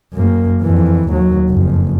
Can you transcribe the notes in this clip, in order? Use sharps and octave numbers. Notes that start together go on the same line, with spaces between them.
F#2 A#3
F2 E3
D#2 F#3
F#1 F2